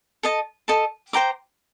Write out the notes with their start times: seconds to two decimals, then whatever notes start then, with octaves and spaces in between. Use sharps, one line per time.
0.23 A4 D#5 A5
0.68 A4 D#5 A5
1.13 C5 G5 A#5 D6